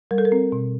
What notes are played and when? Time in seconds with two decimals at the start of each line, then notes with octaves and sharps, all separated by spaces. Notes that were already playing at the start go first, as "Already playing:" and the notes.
0.11 G3 A#4
0.18 A4
0.25 A#4
0.32 C4
0.52 B2